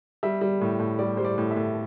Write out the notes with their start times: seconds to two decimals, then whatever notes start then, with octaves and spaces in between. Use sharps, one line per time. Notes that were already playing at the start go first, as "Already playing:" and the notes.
0.23 G3 E5
0.41 G3
0.61 A2
0.79 A2
0.99 G3 D5
1.17 G3 C5
1.24 D5
1.38 A2
1.51 E5
1.56 A2